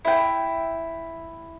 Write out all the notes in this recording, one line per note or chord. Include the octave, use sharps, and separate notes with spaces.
E4 G5